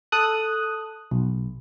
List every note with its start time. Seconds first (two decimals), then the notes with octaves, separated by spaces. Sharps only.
0.12 A4 D#6 F#6
1.11 B1